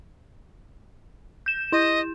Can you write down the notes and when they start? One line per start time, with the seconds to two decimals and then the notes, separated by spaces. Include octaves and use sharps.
1.46 G6 E7
1.72 E4 D#5